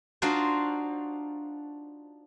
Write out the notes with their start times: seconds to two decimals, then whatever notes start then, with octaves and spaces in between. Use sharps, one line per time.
0.22 D4 D#4 F4 F#4 C5